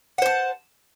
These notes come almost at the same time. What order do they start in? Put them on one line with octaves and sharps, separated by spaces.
F#5 C5 A5